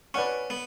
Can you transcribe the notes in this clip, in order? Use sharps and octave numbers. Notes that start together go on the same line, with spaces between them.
C#4 B4 D5 F#5 C#6
B3